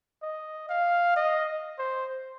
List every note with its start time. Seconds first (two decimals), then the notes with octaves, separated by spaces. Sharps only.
0.23 D#5
0.69 F5
1.16 D#5
1.79 C5